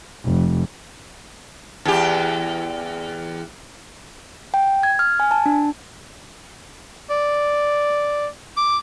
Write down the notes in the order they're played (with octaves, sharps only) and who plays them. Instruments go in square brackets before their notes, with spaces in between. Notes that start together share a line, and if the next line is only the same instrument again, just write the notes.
[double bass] F1
[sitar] E2 G4
[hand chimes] G5
G#6
F6
G#5
A5
D4
[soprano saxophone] D5
D6